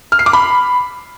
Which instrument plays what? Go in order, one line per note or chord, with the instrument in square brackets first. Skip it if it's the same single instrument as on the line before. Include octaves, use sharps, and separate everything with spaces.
[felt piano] F6
C7
D6
B5